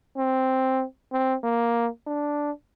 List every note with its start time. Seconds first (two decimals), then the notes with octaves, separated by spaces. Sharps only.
0.17 C4
1.12 C4
1.43 A#3
2.07 D4